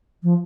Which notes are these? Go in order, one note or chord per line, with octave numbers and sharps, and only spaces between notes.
F3